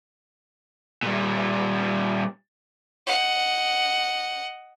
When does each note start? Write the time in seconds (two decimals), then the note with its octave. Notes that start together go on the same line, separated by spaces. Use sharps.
1.03 A#2 G3
3.07 D#5 F#5